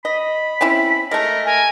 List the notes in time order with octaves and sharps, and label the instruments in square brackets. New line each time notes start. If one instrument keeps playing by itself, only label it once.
[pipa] D#5 [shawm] B5
[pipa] C4 C#4 E4
[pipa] G#3 A3 [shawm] A#4
[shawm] A#4 [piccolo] G#5